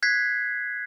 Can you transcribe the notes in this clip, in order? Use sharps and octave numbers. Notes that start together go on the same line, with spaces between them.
F#6 G#6 B6 C7